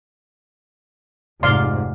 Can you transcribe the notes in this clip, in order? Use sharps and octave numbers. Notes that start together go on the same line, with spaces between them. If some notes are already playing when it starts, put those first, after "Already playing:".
F1 G#2 D5 F5 C6